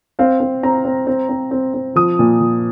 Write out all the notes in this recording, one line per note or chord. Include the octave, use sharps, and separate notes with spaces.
C4 F5
C4
C4 A#5
C4
C4
C4
C4
C4
F3 D#6
A#2
F3